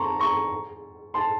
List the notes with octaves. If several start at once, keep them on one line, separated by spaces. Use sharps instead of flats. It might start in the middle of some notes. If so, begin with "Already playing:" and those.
Already playing: A5 A#5 C6 C#6
A#5 C#6
A5 C6